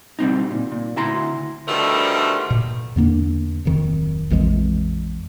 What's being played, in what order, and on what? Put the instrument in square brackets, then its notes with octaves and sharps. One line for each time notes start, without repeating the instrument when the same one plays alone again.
[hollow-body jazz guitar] B2 G3 C4 D#4
A#2
A#2
D2 E4 A#5 C6
[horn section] B2 D3 D#3 F3 G3 A3
[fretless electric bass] A#2
E2 D3 A#3 D4
D1 F2 D#3
A#1 F2 E3 G#3